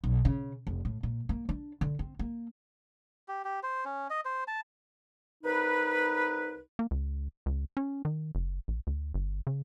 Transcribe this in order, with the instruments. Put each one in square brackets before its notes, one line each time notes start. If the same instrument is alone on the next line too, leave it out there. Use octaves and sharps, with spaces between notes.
[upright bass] B1
C#3
F1
A2
A#2
A#3
D4
D3
C4
A#3
[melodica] G4
G4
C5
C#4
D#5
C5
A5
[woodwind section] C2 D#4 B4
[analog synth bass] A#3
C#2
C#2
C#4
D#3
F#1
A#1
D2
G1
C#3